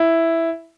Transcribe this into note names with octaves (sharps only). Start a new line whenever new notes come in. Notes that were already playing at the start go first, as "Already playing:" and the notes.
Already playing: E4